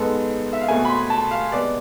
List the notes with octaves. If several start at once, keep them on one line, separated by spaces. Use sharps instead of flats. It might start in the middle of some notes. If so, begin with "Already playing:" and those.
Already playing: G#2 G#3 B3 A4
E5
F5
B2 A3 C4 G#5
B5
C6
A5
F5
C3 G#3 B3 D5